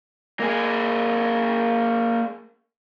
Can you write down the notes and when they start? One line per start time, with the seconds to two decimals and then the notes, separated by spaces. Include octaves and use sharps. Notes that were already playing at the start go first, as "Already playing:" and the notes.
0.40 A#3 G#4